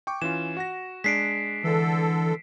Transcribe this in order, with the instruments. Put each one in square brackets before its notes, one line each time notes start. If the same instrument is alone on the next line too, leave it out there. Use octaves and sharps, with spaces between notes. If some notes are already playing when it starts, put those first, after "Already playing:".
[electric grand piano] G5 C#6 D6
[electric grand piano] E3 C#4 F4 [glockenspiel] E7
[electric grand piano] F#4 F#5 A#6
[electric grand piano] G#3 D4 [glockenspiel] B6 C7 D7
[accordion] D3 A4 [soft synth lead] E3